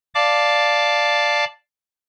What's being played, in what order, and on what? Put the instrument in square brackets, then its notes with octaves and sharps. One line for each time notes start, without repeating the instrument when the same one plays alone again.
[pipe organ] D5 F5 A5 D6